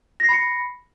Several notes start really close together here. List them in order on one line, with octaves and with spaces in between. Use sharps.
A#6 C7 B5 C#7